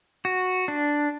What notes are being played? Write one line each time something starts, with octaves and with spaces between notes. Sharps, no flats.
F#4
D4